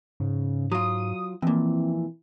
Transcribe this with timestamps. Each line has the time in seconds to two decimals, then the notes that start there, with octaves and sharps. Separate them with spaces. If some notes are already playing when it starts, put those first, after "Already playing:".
0.20 G#2 C#3
0.72 F#3 F4 D#6
1.42 F2 A#2 E3 C4